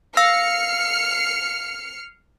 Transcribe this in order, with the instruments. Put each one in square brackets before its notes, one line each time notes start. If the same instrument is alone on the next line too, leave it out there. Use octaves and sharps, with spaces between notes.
[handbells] F5 E6 A#6 [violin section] F6 C7 C#7